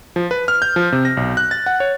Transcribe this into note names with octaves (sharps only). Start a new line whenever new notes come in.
F3
B4
F6
G6
F3
C3
A#6
B1
F#6
A6
F#5
C#5